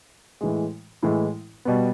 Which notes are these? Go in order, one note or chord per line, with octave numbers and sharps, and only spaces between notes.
A2 E3 G#3
A2 E3 G#3
B2 G3 B3